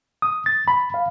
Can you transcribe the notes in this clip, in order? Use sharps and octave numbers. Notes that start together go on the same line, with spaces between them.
D#6
A6
B5
F5